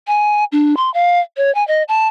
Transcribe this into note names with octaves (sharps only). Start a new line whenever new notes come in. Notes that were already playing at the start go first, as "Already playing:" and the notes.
G#5
D4
C6
F5
C#5
G#5
D#5
A5